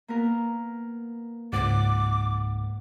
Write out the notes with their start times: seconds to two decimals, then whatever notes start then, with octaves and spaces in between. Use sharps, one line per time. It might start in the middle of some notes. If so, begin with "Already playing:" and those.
0.08 A#3 B3 A#4
1.53 C#2 G#2 F#5 D6